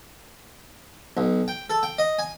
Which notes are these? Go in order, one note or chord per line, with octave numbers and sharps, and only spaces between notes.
B1
G5
A4
G5
D#5
G#5